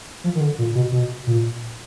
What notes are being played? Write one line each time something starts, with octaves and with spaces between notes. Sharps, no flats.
F3
D#3
D3
A#2
B2
B2
A#2